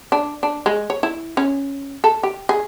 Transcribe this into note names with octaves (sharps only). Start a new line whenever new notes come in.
D4
D4
G#3
C#5
E4
C#4
A4
G4
G#4